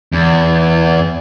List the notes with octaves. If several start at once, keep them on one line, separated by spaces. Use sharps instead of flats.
E2